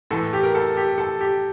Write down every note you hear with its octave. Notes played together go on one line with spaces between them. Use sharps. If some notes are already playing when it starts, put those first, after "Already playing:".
A2 E3 A4
G4
A#4
A4
G4
A4
G4